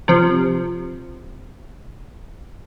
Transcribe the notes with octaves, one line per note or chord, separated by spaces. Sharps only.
C3 F3